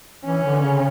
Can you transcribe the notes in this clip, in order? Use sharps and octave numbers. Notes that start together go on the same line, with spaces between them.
E3 C#4
D3
C#3